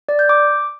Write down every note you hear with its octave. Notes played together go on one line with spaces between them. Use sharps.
D5
G6
D6